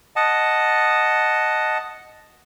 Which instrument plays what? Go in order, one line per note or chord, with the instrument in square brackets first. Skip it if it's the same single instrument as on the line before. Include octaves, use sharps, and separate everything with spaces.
[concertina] D#5 F#5 A5